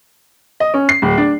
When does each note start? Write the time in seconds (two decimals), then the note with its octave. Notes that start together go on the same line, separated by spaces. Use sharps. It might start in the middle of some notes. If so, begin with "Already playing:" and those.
0.60 D#5
0.74 C#4
0.89 C7
1.02 D1
1.18 D4